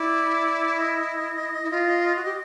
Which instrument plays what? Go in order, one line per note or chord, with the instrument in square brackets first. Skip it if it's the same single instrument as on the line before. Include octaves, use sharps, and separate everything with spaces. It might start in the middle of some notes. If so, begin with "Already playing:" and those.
Already playing: [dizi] E4 [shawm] D5
[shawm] D#5
[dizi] E4
F4
F#4
G4